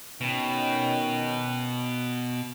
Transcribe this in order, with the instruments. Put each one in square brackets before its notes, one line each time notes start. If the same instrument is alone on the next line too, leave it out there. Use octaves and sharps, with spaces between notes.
[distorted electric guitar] B2 [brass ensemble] D#3 C#4 G5